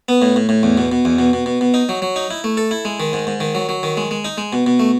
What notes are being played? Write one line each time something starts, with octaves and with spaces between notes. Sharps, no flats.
B3
A2
A2
A2
E2
B2
B2
E2
B2
B2
B2
B2
D#4
F#3
F#3
D#4
E4
A3
A4
E4
G#3
D#3
G#2
G#2
D#3
F#3
F#3
D#3
G#3
G#3
D#4
G#3
B2
B2
A3